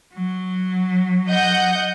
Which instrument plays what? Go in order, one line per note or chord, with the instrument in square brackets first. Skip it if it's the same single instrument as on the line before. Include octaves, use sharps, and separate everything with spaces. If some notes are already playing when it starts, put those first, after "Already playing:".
[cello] F#3
[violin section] D#5 F#5 G6